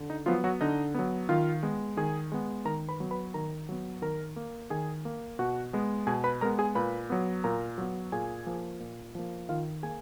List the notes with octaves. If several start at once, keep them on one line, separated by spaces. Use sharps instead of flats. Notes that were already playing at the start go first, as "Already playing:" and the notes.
Already playing: D3
D#4
F3 F#3 B3 F4
F#3 F#4
D3 D#4 D#5
F#3 B3
D#3 F4 F5
G#3 B3
D#3 G#4 G#5
G#3 B3
D#3 A#4 A#5
B4 B5
F#3 B3
B4 B5
D#3 A#4 A#5
F#3 B3
D#3 A#4 A#5
A#3
D#3 G#4 G#5
A#3
B2 F#4 F#5
G#3 B3
B2 G#4 G#5
B4 B5
G#3 B3 A#4 A#5
G#4 G#5
A#2 B4 B5
F#3 B3
A#2 A#4 A#5
F#3 B3
A#2 G#4 G#5
F3 A#3
A#2
F3 A#3
D#3 F4 F5
A#3 G#4 G#5